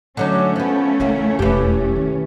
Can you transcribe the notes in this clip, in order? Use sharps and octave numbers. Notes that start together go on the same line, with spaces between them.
D3 F#3 A3 C#4 D#4
F3 B3
E2 C#3 A#3 F4
E1 F2 E3 G4
D#3 E4